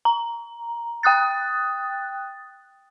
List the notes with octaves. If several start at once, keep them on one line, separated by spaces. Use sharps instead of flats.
A#5
G5 D#6 F#6 A6